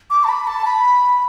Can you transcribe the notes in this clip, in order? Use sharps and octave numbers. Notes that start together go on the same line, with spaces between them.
D6
A5
B5
A5
B5